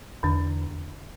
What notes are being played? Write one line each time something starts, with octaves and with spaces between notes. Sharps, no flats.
E2 D3 D4